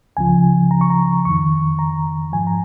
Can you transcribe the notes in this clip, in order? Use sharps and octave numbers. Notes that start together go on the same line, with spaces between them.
C#2 C#3 F3 G#5
A#5
C#6
A#5
F2 D#3 C#6
A#5
G#2 F3 G#5
A#5